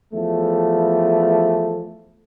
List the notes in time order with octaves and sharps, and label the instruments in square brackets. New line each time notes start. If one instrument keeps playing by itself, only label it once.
[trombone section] E2 F3 A3